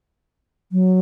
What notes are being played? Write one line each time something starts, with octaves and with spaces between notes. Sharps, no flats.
F#3